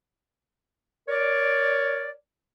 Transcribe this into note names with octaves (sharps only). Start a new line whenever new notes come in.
A#4 C#5 D5